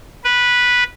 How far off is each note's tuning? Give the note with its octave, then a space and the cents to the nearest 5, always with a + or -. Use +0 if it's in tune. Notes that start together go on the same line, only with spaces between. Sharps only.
B4 -10